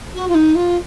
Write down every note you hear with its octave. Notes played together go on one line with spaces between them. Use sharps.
F#4
F4
D#4
F4